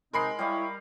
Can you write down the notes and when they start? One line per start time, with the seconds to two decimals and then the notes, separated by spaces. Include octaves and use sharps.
0.13 C3 G#3 C4 D#4 A#4 B5 C7
0.39 G3 E4 C#5 D#5 F5